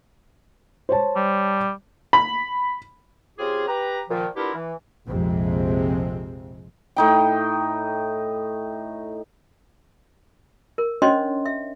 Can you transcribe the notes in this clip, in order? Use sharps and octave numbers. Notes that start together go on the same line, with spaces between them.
C5 C#5 A5
G3
B5
C#3 C4 F4 G4 G#4
G4 B4 A#5
A#2 D#3 F3
B3 D4 E4 F4 G4 A#4
E3
A#1 F2 C3 G#3 C4
A2 D#4 G5
A#4
C#4 D4 C5 C#5 D#5 C6
E5